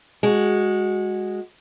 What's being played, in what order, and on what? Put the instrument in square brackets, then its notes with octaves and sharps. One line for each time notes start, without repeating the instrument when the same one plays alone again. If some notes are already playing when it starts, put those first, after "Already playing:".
[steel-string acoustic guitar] G#3 F#4